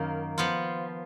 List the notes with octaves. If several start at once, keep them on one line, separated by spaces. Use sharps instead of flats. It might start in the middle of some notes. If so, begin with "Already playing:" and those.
Already playing: F#2 D#3 A#3
F3 B3 F4